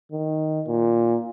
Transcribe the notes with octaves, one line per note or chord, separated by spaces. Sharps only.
D#3
A#2